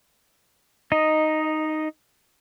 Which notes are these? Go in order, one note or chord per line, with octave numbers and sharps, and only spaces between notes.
D#4 D#5